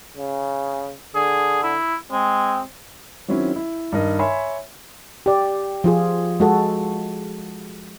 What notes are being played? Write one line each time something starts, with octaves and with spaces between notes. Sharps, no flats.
C#3
D3 G#4
E4
G#3 C4
D#3 F#3 C4 C#4 E4
E4
G2 D#3 A#4 D#5
C#5 E5 G#5 B5 C6
G4 D5
F3 F4 G#4
G#3 F#4 A4